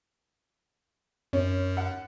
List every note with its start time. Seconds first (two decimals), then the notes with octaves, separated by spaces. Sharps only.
1.33 F#2 C#4
1.77 F#5